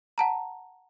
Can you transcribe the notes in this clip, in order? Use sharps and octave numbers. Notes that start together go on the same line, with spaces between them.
F#5 A5 A#5